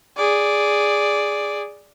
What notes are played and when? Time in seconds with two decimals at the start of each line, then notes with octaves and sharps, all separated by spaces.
0.17 G#4 D5